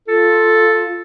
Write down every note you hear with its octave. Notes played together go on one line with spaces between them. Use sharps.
F4 A4